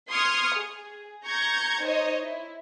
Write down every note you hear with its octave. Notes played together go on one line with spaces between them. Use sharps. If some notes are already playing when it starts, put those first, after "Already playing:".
C6 C#6 D#6 F6 G#6
G#4
A#5 C#6 G6 G#6 A#6
D#4 C5 C#5 D#5
E4